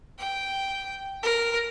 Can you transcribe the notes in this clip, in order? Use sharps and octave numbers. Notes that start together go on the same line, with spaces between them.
G5
A#4